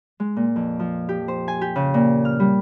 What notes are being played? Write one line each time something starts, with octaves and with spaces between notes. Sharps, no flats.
G#3
A#2
F2
F3
G4
C5
G#5
G4
C#3
A#2
F6
G3